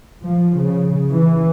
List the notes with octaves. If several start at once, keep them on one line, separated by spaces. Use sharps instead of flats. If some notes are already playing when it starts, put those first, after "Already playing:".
F3
C#3
E3